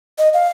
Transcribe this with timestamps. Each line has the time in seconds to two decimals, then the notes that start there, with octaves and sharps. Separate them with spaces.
0.18 D#5
0.34 F5